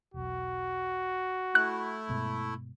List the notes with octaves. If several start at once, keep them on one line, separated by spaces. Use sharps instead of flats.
E1 B1 F#4
A3 E4 F#6
G2 B2 G#3